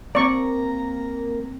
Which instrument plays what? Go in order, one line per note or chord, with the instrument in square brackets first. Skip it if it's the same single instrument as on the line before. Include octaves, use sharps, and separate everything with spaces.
[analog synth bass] A#3 [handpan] C4 [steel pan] D5 C#6 [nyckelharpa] A#5